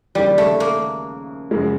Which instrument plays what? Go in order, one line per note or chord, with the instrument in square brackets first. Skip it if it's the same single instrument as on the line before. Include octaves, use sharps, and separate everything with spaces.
[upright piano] D#2 C#3 F3 [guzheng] G3
[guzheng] A3
A#3
[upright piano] F#2 C#3 F3 G#3